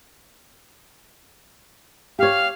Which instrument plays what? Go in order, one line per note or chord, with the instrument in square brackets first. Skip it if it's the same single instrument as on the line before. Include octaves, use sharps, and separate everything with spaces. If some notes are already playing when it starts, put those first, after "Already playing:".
[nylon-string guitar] G4 C#5 [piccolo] F5